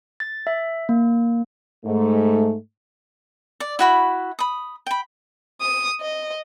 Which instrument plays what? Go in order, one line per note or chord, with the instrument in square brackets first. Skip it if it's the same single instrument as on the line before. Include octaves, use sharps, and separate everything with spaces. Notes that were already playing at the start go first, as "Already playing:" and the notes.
[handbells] A6
E5
A#3
[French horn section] G#2 A3
[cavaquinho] D5
E4 F#4 B5 C#6
B5 D#6
G5 B5
[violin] D#6
D#5